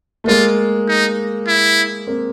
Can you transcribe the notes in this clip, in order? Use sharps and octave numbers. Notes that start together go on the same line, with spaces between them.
A3
G#3 A#3 F4
D#4
E4
A#3 C4